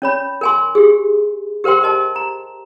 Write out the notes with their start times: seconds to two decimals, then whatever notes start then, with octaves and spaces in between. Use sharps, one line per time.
0.02 C#4 C#5 B5
0.41 A#4 G#5 C6
0.75 G4 G#4
1.64 G4 A#4 C5 G5 C6
1.83 A#4 D#5 A5
2.16 A#5